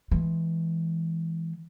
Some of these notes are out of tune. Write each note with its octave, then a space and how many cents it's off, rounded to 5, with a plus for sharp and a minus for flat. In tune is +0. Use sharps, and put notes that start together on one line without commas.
E3 +0 G#3 +15